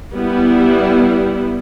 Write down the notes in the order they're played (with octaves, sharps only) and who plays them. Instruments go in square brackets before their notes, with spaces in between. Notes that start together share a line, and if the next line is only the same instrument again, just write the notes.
[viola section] G3 B3 E4